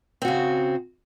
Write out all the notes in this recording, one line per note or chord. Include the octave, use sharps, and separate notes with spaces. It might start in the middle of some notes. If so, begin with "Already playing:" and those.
C#3 C4 F#4